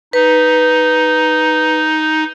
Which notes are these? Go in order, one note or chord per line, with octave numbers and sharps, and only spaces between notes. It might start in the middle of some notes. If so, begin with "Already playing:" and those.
D#4 B4